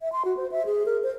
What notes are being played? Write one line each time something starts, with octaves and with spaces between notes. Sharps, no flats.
E5
C6
F#4
C5
E5
G#4
A#4
C5